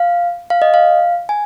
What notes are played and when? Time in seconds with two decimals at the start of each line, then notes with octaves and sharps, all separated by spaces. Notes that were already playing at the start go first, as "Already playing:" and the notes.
Already playing: F5
0.50 F5
0.62 D#5
0.74 F5
1.29 G#5